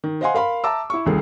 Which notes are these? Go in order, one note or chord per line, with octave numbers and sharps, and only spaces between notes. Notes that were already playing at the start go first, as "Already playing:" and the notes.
D#3
C5 D#5 F5 F#5 G#5 C6
A#4 F5 B5 C6
E5 A5 A#5 D6 E6
E4 C#6
D#1 C2 D#3 G#4 A4